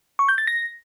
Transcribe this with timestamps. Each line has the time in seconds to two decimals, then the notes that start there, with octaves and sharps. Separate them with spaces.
0.19 C#6
0.29 G6
0.38 A6
0.47 A#6